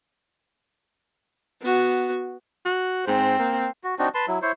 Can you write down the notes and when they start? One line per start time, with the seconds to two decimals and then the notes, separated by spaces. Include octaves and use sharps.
1.61 B3 F#4
2.65 F#4
3.07 G#2 C4
3.39 A#3
3.84 F#4
3.99 C4 D4 D#4 F#4
4.14 B4 A5 C6
4.28 F#3 E4
4.42 E4 C5 C#5